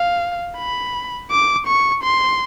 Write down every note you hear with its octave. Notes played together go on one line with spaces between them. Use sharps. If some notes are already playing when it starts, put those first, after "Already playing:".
Already playing: F5
B5
D6
C#6
C6